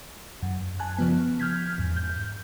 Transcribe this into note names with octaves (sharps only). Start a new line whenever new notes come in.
F#2
G#5 A5 F#6
C#3 F3 B3
F6 G6 G#6 B6
E2 G#2
G6